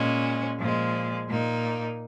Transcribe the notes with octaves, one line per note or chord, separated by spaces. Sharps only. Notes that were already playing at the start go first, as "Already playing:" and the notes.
Already playing: A#2 G#3 C#4
A#2 F3 G#3
A#2 A#3 D#4